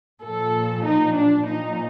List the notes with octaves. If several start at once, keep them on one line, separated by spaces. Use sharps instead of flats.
A#2 F3 A4
D#4
D4
A#2 F3 D#4